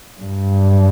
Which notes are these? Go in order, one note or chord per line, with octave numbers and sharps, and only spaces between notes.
G2